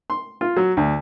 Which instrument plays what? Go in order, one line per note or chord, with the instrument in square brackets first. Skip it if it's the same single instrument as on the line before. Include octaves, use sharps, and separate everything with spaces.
[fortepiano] C6
F4
F#3
D2